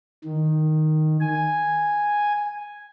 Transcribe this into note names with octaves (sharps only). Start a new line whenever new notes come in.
D#3
G#5